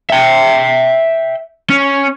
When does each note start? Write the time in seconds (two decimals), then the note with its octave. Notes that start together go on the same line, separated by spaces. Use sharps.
0.10 E5 G5
1.70 C#4